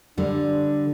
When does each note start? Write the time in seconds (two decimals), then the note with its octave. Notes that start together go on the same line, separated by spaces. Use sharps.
0.18 D3 G3 D4